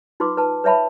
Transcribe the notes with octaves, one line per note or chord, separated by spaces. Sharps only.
D#4 F4 B4 C6 D6
B4 A5
B4 C#5 E5 A5 B5